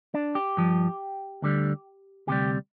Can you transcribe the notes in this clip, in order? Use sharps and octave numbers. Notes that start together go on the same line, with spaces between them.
D4
G4
G2 F3
D2 D3 G3
D2 C3 G3 G4